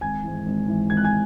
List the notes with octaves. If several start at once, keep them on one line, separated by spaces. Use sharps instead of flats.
G#1 G#5 G#6
G#2 E3
G#1
G#2 E3
G#1 G#6
F#6
G#5 G#6